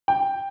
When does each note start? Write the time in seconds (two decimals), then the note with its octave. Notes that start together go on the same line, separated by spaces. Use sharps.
0.08 G5